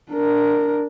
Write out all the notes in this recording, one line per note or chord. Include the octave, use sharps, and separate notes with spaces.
D4 A#4